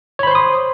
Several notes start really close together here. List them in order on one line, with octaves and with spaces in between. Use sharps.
C#5 B5 C5 C6 D#6